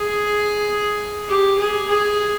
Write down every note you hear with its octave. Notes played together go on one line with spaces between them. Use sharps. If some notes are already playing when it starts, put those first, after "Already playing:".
Already playing: G#4
G4
G#4
G#4